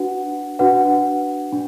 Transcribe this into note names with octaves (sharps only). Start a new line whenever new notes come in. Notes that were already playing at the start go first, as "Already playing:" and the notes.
Already playing: D4 F#4 B4 F#5
D4 F#4 B4 F#5
D4